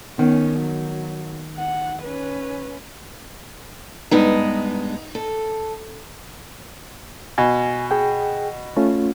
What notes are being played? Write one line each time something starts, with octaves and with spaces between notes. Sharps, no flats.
D#3 B3 C#4
F#3
F#5
C#4 B4
G2 G#3 B3 D#4
A4
B2 G#5
G#4 G5
A3 C#4 F4